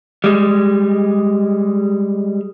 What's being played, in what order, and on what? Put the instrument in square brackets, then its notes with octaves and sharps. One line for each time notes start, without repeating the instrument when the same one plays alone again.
[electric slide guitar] G3 G#3